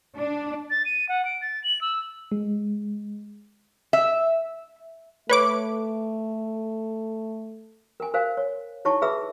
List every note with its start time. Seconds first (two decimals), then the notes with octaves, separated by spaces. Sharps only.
0.18 D4
0.70 A6
0.85 D#7
1.09 F#5
1.25 D7
1.42 A6
1.64 F#7
1.81 E6
2.32 G#3
3.93 E5
5.30 A3 B4 C#5 D6
8.00 A#4 G#5
8.14 A#4 C5 F5 G#5
8.37 C#5
8.85 D#4 E4 C#5 A5 C#6
9.02 G#4 B4 E5 B5 E6